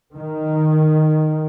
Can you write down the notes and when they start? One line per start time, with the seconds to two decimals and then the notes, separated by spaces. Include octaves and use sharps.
0.15 D#3